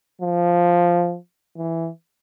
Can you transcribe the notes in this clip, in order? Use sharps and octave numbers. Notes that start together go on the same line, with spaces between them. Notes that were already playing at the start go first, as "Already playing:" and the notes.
F3
E3